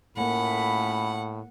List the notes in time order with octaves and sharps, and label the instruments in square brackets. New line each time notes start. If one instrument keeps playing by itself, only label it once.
[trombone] A2 [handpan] A3 A#3 [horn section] C#4 F4 B5 [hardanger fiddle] F#5